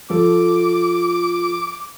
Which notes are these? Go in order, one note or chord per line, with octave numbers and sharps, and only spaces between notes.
F3 A4 D6